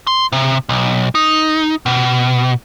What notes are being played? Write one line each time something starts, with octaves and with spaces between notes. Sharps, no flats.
C6
C3
B1
D#4
B2